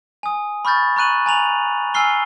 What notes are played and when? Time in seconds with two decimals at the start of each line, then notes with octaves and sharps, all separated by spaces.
0.23 G#5 D#6
0.65 B5 C#6 F6 G6 A6
0.96 A#5 C#6 F#6 D#7 F#7
1.26 G#5 A#5 F7 F#7
1.94 G#5 E6 F6 C7 G7